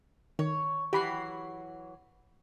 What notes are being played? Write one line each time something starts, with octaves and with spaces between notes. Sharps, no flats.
D#3 C#5
E3 F#3 F#4 G4 B5 C7